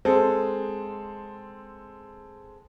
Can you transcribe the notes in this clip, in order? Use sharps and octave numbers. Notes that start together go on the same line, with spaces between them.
G#3 C4 A4